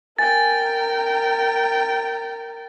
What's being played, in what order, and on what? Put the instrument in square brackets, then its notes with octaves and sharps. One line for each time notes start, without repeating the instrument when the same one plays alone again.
[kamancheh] A#4 G5 [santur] G#5 [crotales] A6